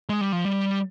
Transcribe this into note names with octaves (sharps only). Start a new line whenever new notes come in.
G#3
G3
F3
G3